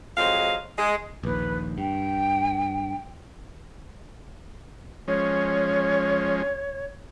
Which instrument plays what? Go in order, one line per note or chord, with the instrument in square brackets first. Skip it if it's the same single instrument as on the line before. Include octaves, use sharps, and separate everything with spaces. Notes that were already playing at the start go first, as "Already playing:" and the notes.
[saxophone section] F2 F#3 G#3 C5 D#5 F5
G#3
[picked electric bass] A#1 D#2 [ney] B4
[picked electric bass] G2 [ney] G5
[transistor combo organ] F3 G#3 C#4 [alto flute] C#5